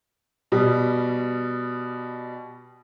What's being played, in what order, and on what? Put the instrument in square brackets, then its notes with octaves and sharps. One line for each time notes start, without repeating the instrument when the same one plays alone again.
[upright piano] B2 G3